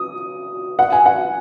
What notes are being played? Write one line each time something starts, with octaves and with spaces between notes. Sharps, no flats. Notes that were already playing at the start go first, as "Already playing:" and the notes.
Already playing: D#6
F#5
G#5
F#5